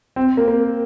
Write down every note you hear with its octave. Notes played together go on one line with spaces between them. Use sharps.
C4
A#3
A#3